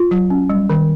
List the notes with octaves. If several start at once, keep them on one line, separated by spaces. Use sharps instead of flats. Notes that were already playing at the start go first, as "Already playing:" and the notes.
Already playing: F4
F#3
C#4
G3
D#3